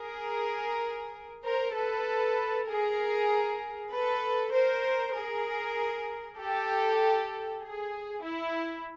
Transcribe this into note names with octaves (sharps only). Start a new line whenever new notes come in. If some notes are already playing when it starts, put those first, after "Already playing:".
Already playing: G#4 A#4
A#4 C5
A4 B4
G#4 A#4
A4 B4
A#4 C5
G#4 A#4
G4 A4
G#4
E4